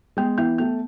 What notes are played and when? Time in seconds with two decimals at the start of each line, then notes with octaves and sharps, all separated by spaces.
0.17 G#3 B3
0.38 E3 B3 E4
0.58 A3 B3